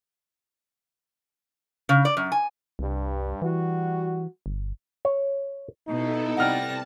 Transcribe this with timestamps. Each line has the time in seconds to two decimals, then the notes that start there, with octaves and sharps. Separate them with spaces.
1.89 C#3
2.05 D5
2.17 F#2
2.32 G#5
2.79 C2 G2
3.42 E3 G3 F#4
4.46 G1
5.05 C#5
5.87 B2 B3 D#4 E4 A4
6.37 C3 G3 F#5 A5 F6 A#6